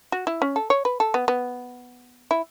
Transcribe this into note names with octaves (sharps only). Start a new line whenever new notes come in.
F#4
E4
C#4
A4
C#5
B4
A4
B3
B3
E4